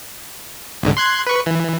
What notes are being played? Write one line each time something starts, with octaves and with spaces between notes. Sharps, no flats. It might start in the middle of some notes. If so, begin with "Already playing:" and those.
C2 G#2 D3
C6 F#6 G#6
B4 C#6
E3